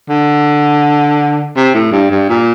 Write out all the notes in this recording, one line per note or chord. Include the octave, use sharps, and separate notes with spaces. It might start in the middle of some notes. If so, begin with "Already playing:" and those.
D3
C3
A2
G2
G2
A#2